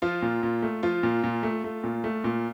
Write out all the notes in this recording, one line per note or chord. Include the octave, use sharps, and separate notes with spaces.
F3 F4
A#2
A#2
A3
F3 F4
A#2
A#2
A3
A3
A#2
A3
A#2